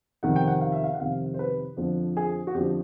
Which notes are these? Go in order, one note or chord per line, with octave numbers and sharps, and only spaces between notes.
F2 C3 D#3 F#5
G5
F#5
F5
E5
F5
F#5
F2 C3 D#3 F5
C5
B4
F2 D3 F3
G#4
F#4
F2 D3 F3 G4